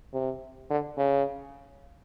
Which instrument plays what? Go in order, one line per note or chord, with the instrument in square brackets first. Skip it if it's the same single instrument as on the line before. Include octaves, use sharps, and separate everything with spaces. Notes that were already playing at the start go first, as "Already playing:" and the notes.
[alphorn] C3
D3
C#3